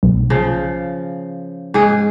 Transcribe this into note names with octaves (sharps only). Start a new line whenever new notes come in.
B1
C#3 F3
G#2 G#4